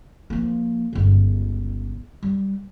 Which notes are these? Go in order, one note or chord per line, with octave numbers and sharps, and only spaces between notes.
F3 A#3
G1 C#2
G3